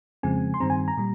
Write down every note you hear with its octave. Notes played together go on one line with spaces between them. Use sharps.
F2 C#3 F3 G#3 C4 G#5
C6
G2 D#3 G3 C4 A#5
G#5
A#5
A#2 G3